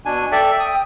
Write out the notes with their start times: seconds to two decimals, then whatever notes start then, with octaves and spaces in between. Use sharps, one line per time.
0.05 B2 D4 G#5
0.32 A4 D5 E5 G5
0.60 D#6